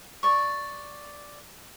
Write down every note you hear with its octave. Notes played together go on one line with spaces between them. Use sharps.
D5 C#6